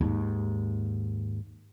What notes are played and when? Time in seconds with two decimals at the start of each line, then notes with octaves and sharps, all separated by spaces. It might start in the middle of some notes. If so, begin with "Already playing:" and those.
0.01 D#2 G#2